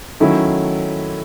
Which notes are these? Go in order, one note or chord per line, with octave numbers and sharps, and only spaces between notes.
D#3 F#3 A3 C#4 E4